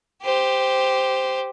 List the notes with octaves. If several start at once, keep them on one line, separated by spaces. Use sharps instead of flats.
G4 C5